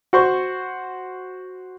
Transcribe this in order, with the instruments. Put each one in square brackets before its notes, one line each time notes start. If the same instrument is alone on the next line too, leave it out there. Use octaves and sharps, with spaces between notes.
[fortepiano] F#4 C5 C#6